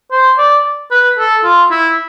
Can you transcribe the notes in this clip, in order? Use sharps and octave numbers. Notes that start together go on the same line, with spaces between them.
C5
D5
B4
A4
F4
E4